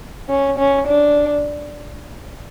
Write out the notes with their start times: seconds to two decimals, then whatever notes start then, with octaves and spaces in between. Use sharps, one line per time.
0.29 C#4
0.58 C#4
0.87 D4